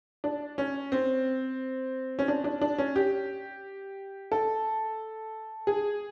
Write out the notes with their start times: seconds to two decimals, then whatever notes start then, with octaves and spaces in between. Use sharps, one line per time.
0.24 D4
0.58 C#4
0.92 C4
2.19 C#4
2.28 D4
2.44 D4
2.61 D4
2.78 C#4
2.96 G4
4.32 A4
5.67 G#4